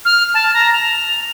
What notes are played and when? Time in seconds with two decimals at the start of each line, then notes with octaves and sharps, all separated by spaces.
0.05 F6
0.34 A5
0.54 A#5
0.73 F7